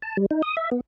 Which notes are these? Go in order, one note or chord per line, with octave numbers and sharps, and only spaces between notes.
A5
G3
D#4
D#6
E5
B3